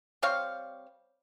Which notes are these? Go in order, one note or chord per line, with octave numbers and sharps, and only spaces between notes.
G3 C4 C#5 F5